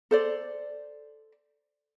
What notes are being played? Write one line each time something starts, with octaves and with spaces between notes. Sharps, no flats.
A4 C5 D5